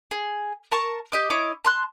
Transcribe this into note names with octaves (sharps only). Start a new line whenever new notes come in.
G#4
A#4 A5 C#6
G4 D#5 D6
E4 C#5 D#5 D6
A5 C6 F#6